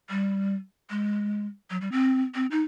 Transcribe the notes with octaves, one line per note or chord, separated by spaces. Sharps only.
G3
G#3
F#3
G3
C4
C4
D#4